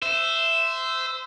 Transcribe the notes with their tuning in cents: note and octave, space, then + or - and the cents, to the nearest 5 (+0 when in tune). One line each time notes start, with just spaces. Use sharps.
C5 -20 E5 +5